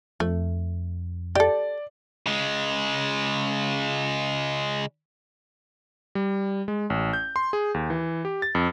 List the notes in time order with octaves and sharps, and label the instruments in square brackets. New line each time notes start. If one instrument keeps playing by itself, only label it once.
[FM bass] F2 [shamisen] A3
[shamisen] G4 A4 [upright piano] D5
[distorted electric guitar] C#3 G#3
[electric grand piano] G3
G#3
A1
G6
C6
G#4
D#2
E3
G4
A6
F2